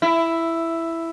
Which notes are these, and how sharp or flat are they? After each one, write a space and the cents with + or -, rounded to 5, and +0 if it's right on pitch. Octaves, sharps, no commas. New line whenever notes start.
E4 +5